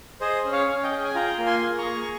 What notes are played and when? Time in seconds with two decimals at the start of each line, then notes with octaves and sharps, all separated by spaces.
0.21 G#4 C5 D#5
0.45 C#4
0.52 C#5 F5
0.69 C#4
0.83 D#5 G5
0.91 G#4
1.04 G#5
1.15 F4 G5 A#5
1.38 A#3
1.46 G#5 C6
1.62 G#4
1.78 A#5 C#6
1.86 G#4
2.02 C#6